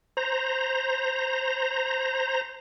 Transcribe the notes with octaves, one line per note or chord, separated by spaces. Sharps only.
C5 A#5